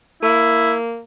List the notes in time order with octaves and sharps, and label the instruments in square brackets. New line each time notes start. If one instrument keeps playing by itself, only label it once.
[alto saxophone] A#3 [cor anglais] E4